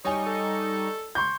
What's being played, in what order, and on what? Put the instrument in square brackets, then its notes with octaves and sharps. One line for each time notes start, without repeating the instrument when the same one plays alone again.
[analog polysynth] G3 D#4 C#6 [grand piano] C#5 G#5 [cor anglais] D#5
[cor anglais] A4
[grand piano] C6 C#6 G6